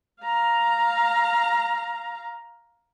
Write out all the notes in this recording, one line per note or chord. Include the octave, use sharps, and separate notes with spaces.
F5 A#5